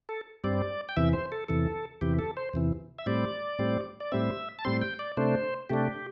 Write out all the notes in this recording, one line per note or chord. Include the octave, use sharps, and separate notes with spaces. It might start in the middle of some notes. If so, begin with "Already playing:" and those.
A4
G2 G3 C4 D5
G5
E2 C3 E3 E5
C5
A4
E2 C3 E3 A4
E2 C3 E3 G4
A4
C5
E2 C3 E3
E5
A2 G3 C4 D5
A2 G3 C4
D5
A2 G3 C4 E5
A5
A2 G3 C4 C6
G5
D5
C3 A3 D4 C5
C3 A3 D4 G4